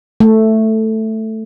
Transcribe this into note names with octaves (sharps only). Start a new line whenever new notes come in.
A3